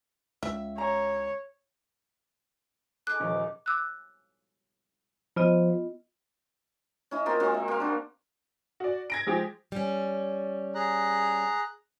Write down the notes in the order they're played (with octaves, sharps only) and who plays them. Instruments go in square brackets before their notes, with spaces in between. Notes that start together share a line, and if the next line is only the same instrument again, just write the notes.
[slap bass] C#2 [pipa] E5
[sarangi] C#5 [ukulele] A#5
[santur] G#3 D#4 A4 [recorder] D6 [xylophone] F#6
[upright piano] D#1 F3 C#4
[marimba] D6 E6 F#6
[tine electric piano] F3 [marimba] B3 F4 D#5
[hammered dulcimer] C#4 E4 D#5
A#3 C4 F4 A#4
G#3 C4 F#4
E5
A#3 F5
D4 F#4
[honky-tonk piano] F#4 D5
G#6 A#6 D7
F3 G#3 G4
[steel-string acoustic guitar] G3 C#4
[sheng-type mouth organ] G#4 A#5 F#6